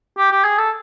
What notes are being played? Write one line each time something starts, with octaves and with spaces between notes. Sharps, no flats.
G4
G4
G#4
A4